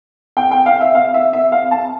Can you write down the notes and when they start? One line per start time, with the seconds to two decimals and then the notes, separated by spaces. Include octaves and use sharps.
0.37 G5
0.51 G5
0.66 F5
0.81 E5
0.95 F5
1.14 E5
1.33 E5
1.52 F5
1.71 A5